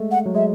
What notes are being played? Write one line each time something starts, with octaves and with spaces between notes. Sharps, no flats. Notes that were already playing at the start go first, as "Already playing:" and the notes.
Already playing: G#3 A3
F#5
F#3
G#3 E5